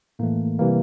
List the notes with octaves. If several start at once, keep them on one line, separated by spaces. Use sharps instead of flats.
A2 E3 A3 A#3
C3 E3 G3 A#3